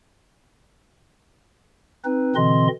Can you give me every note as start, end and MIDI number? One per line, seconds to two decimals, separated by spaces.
2.05 2.35 60
2.05 2.35 63
2.05 2.35 71
2.36 2.68 47
2.36 2.68 50
2.36 2.68 52
2.36 2.68 60
2.36 2.68 75
2.36 2.68 84